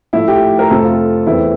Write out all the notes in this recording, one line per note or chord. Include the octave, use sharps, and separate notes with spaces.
A2 F3 A3 E4
G4
A#4
F2 C3 F3 A3 C4 A4
F4
E2 E3 A3 C4 E4